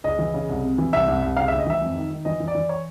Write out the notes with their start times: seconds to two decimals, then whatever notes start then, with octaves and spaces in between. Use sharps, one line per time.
0.04 C#2 D#5
0.19 E3
0.34 C#3
0.49 C2
0.63 C3
0.78 E3
0.93 C2 E5
1.08 C2
1.22 C2
1.37 C#3 F5
1.48 E5
1.51 D2
1.59 D#5
1.66 E3 E5
1.81 F2
1.96 D#3
2.11 D#3
2.25 E3 D#5
2.40 E3
2.48 D5
2.55 E3
2.69 C#5